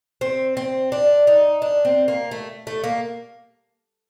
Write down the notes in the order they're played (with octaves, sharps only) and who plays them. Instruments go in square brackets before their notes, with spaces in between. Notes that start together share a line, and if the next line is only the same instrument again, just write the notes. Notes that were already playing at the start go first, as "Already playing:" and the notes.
[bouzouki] C4
C4
D4
D#4
D4
C4
A#3
A3
A3
A#3